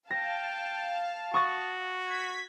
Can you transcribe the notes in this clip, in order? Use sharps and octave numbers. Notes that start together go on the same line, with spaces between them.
F5 G5 A5 A#6
F#4 C#6 D#6 A6
G#6 B6